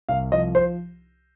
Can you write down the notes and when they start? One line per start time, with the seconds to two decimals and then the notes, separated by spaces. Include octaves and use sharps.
0.09 C2 F5
0.32 F3 D#5
0.55 C5